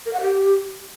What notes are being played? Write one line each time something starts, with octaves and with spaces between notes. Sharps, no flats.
A#4
F#5
G4